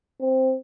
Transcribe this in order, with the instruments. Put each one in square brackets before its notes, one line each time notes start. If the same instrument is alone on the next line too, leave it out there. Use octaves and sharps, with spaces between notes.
[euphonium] C4